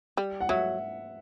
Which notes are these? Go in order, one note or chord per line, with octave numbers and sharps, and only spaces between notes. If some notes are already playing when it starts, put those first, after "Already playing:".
G3
F#5
F#3 E5